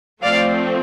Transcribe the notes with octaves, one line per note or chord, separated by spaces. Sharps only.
F3 A3 C4 D5 F5